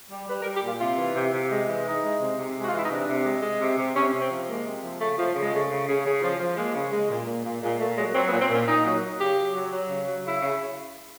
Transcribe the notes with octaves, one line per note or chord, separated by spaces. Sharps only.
G3
G3 B4
A#4
G3
G4
A#2 F4
C3 F4
E3
C3
C3
G#3
E3
G#3 D#4
G#3
C3
C3
G#3
F#4
F4
E3 E4
D#4
C3 D4
C3
G#3
G#3
C3
C3
C3 C#4
C3
C4
F3
G#3 A#3
C3
F3
C#3 A3
F3
C#3
G#3
C#3 A3
C#3
C#3
C#3
F3
F3
G#3 A#3
C#3
G#3
A#2
A#2
A#2
A#2 G#3
A#2 A3
F#3 G#3
F#3 C4
B3
A#2
C4
A#2 C#4
A#2 D#4
F#3
F#3
C#3 G4
F#3
F#3
F#3
C#3
F#3
C#3 E4
C#3